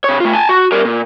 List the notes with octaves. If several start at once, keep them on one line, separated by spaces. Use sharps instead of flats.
C3 C#5
A3 F4
G#5 A5
F#4
G3 A#4
A#2